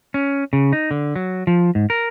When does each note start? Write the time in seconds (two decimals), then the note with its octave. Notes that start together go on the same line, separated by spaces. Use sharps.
0.14 C#4
0.53 C#3
0.73 D#4
0.91 D3
1.16 F#3
1.47 F3
1.75 G#2
1.90 A#4